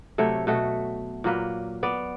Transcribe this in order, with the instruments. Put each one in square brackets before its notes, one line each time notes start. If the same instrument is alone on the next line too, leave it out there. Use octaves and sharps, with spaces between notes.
[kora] C3 F#3 A3 C#5
B2 A3 F#4
A#2 F#3 A#3 B4
B3 D5